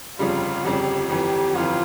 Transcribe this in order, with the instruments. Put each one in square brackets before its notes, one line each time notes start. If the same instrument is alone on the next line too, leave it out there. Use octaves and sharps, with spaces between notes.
[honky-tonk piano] G1 F2 C#3 G3 [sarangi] F4
[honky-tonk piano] G1 F2 C#3 G3 [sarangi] G4
[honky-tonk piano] G1 F2 E3 [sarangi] G4
[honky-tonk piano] G1 F2 E3 [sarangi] F4